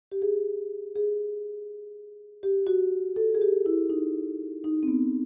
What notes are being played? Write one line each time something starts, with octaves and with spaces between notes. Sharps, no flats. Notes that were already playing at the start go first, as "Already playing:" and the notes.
G4
G#4
G#4
G4
F#4
A4
G#4
G4
E4
D#4
D#4
C4
B3